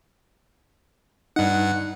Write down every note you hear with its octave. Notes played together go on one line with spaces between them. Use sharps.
G2 D#4 F#5